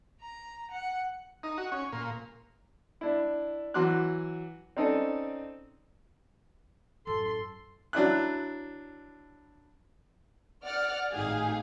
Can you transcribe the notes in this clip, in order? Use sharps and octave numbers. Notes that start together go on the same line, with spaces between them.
A#5
F#5
D#4
F#4
C#4
A#2
D4 E4
E3 F#3 F#4 C6 D6 F#6
C4 C#4 D#4 A4 D5
A1 F#2 A4 C6
F#3 D4 E4 F#6
D5 F#5 F6
G#1 A2 D#4 G4 G#4 F5